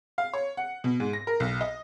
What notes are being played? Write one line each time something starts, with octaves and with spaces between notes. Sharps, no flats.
F5
C#5
F#5
B2
G#2
A#6
A#4
B1
D#5